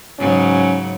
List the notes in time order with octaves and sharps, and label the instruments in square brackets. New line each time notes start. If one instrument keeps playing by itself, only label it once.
[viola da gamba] G#2 C#3 F#3 [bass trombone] C#4